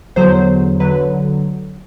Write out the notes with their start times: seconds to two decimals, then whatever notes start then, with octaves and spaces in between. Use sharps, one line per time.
0.16 E2 D3 F#3 C5
0.80 D3 F#3 B4